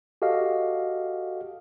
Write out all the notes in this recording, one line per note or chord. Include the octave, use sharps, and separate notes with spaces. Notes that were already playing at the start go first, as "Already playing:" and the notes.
F#4 G4 A4 D#5 F5